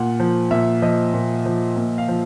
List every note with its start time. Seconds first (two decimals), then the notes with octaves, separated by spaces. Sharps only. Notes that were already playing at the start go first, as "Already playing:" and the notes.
Already playing: A#2 F#5
0.20 F3
0.51 A#2 E5
0.82 F3 D#5
1.14 A#2
1.46 F3
1.77 A#2
1.98 F5
2.08 F3